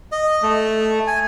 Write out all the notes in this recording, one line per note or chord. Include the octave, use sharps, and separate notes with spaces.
D#5
A3
G#5